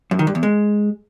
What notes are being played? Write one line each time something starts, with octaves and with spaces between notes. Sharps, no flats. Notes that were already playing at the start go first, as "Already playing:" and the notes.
F#2
D#3
G2
E2
G#3